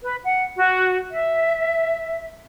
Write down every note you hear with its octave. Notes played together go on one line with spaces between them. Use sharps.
B4
F#5
F#4
E5